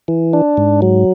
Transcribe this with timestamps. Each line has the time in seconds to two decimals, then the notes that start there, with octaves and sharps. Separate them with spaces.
0.08 E3
0.33 D4
0.57 G#2
0.82 F#3